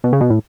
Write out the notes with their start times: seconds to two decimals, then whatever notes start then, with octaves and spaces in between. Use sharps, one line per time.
0.04 B2
0.13 C#3
0.21 B2
0.30 A2